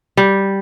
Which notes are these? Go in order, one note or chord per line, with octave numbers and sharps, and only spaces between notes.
G3